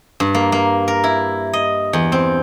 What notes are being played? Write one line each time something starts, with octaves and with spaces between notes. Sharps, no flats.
G2
A#3
A#3
A#4
E4
D#5
E2
C4